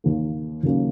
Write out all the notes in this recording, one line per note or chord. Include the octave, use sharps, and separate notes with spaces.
D#2 D#3 A#3
D#2 C#3 F#3 A#3 C#4